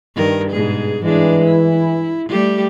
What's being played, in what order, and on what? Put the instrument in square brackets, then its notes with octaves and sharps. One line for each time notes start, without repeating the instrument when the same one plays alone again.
[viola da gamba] G2 D#3 A#4
G#2 B2 G#4
[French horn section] E3 [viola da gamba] G#3 D4
[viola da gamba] E4
G3 A3 G4